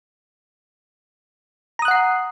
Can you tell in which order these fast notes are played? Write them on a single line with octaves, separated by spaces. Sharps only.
A#5 D#6 F#6 F#5 C7